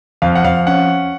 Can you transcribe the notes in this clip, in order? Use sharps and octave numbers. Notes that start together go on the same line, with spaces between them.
F2 F5
F#5
F2 F5
C#4 F#5